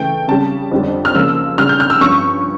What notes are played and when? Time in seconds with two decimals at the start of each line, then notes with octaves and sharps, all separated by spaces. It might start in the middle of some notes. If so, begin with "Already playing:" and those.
Already playing: C#3 E3 A3 G5
0.28 C#3 G3 C#4 A5
0.71 F2 D3 G3 D4
1.05 F6
1.14 C#3 F3 A#3 E6
1.58 C#3 G3 D4 F6
1.69 G6
1.80 F6
1.90 E6
2.01 G2 F3 C#4 C#6